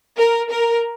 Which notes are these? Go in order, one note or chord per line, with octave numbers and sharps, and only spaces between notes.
A#4
A#4